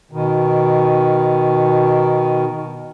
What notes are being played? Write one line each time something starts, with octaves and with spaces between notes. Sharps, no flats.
B2 D#3